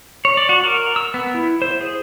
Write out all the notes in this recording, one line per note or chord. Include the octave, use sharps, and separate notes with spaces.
C#5
D5
F#4
A#4
E6
B3
E4
C5
G#4